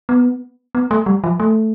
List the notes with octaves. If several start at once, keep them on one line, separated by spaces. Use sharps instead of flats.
B3
B3
A3
G3
F3
A3